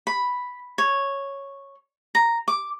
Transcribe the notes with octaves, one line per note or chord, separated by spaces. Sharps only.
B5
C#5
A#5
D6